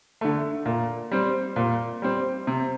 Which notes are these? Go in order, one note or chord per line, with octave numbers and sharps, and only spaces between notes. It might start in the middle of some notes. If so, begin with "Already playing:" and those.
D3 A3
A#2
G3 C4
A#2
G3 C4
C3